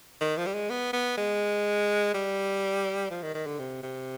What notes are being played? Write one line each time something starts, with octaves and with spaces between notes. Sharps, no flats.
D#3
F3
G3
G#3
B3
B3
G#3
G3
F3
D#3
D#3
D3
C3
C3